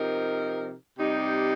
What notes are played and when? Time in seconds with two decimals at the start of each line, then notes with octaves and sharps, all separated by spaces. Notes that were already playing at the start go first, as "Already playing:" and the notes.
Already playing: C3 F3 D#4 A#4
0.98 C3 G3 D#4